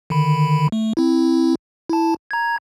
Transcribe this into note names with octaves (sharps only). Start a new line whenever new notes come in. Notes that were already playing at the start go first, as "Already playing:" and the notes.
D3 D#3 B5
A3
C4 E4
E4 A5
A#5 G#6